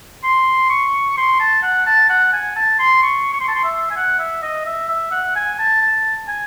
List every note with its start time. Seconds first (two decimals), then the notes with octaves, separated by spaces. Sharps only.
0.23 C6
0.70 C#6
1.17 C6
1.40 A5
1.63 F#5
1.86 A5
2.09 F#5
2.33 G#5
2.56 A5
2.79 C6
3.02 C#6
3.33 C#6
3.40 C6
3.48 A5
3.55 C6
3.64 E5
3.91 G#5
3.96 F#5
4.19 E5
4.42 D#5
4.66 E5
4.89 E5
5.11 F#5
5.35 G#5
5.59 A5
5.82 A5
6.28 G#5